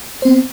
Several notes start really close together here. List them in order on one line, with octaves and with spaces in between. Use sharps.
C5 C4 B3